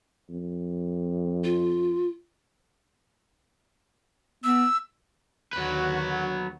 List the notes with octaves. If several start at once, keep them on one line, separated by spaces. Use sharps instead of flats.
F2
F4
B3 E6
D#2 D3 F#3 F#4 B4